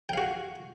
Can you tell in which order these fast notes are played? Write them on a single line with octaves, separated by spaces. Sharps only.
G5 F5 F#4